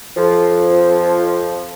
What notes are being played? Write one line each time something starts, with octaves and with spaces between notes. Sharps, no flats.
F2 F3